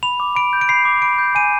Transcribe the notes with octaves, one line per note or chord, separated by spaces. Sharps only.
B5 F7
D6
B5 D7
G6
D7
B5 C7
D6
B5 D7
G6
G#5 D#7